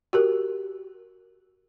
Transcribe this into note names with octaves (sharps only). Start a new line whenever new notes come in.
F#4 G4 A#4